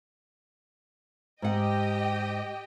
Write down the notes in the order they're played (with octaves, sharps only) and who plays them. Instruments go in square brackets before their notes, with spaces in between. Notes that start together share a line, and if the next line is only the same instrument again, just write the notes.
[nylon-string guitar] G#2 F#5 [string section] G4 D#5 G5